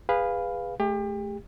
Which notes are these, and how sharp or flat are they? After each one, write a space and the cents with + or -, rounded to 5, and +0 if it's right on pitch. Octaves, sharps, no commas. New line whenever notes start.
G#4 -20 B4 +0 F5 +0
A3 -25 G4 +35